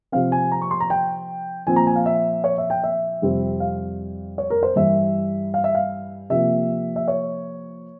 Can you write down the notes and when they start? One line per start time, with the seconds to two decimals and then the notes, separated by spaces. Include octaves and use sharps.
0.12 C3 F3 C4 F5
0.32 G#5
0.52 A#5
0.62 C#6
0.71 C6
0.80 A#5
0.90 G5
1.67 A#2 F3 C4 G#5
1.76 A#5
1.87 G#5
1.96 F5
2.06 E5
2.44 C#5
2.58 E5
2.70 G5
2.84 E5
3.22 F2 C3 G3 C4
3.60 F5
4.38 C#5
4.50 A#4
4.63 C5
4.76 G2 E3 G3 E5
5.54 F5
5.64 E5
5.75 F5
6.30 C3 F3 A#3 E5
6.96 E5
7.08 C#5